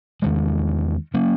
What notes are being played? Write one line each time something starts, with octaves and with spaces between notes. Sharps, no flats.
E2 D#3 G#3
F#3 A#3 C#4